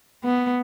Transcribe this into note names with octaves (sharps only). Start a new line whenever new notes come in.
B3